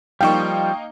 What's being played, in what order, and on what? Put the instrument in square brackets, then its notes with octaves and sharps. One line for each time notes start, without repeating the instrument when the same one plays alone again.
[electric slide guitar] F3 G3 [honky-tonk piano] A#3 D#4 F5 [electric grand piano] G5 C#6